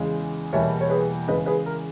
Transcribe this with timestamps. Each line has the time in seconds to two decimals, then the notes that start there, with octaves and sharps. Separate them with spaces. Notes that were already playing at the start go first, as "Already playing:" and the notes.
Already playing: E2 C#3 G#3
0.53 E2 B2 G3 A#3 E4 C#5 E5
0.81 C#5
0.90 G#4 B4
1.28 E2 C#3 G#3 B4 D#5
1.46 G#4 B4
1.66 A#4